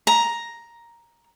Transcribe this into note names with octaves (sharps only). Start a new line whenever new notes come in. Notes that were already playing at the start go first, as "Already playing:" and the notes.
A#5